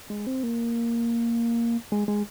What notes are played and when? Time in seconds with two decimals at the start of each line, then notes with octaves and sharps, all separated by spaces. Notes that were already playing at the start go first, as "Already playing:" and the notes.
0.10 G#3
0.27 C4
0.43 A#3
1.92 G#3
2.08 G#3